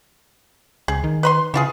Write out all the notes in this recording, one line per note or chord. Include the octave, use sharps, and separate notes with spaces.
C#2 G#4
D#3
B4 B5 C6
C#3 E3 F4 G#4